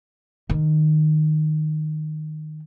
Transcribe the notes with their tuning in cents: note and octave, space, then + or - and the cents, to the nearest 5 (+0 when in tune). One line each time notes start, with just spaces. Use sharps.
D#3 -15